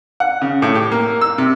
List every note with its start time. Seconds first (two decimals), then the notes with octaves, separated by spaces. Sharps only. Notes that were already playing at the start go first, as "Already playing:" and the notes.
0.20 F#5
0.42 C#3
0.62 A2
0.75 G4
0.91 A#3
1.21 E6
1.38 C3